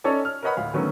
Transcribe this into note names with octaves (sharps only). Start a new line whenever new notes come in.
C#4 D#4 A4 C#5 D5
F6
A#4 B4 C#5 D#5 F#5 B5
D2 A2 F5 B5
D3 D#3 F#3 A3 B3 C#4